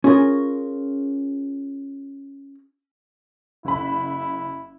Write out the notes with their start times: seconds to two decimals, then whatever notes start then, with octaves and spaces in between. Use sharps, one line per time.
0.04 C#4 F4 G#4 A#4
3.65 F#1 E4 B5